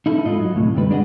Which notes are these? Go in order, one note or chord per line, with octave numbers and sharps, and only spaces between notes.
D#4 E4 A4
G#2 F4 D#5
F#3
D2 A2 C3
C2 G2 D3 G3 B4
G#3 D4 D5 D#5 F#5